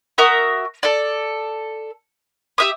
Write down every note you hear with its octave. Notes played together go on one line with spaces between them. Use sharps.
F#4 A#4 E5 D#6
A4 D5
G4 E5 D#6